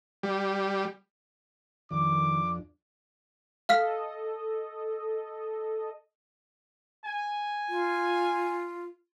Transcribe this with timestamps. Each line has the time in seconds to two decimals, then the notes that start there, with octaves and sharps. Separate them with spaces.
0.23 G3
1.91 F2 D#3 D4 D6
3.69 A4 D#5 F5 F6 B6
7.06 G#5
7.69 F4